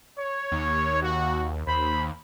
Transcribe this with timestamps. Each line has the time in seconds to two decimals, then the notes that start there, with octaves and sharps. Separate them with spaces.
0.18 C#5
0.52 D#2
1.01 F#4
1.67 D#2 C5 B5